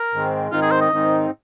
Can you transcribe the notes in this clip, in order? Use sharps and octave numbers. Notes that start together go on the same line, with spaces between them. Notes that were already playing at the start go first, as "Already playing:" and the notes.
Already playing: A#4
G#2 D#3 G#3 C4
G#2 D#3 C4 D#4 F4
G#4
C5
D#5
G#2 D#3 C4 D#4